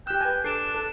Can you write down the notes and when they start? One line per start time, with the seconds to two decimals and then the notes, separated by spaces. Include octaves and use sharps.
0.07 G4 G5 E6 F#6
0.21 B4 G#5
0.44 D4 A4 C7 D7 E7
0.74 A4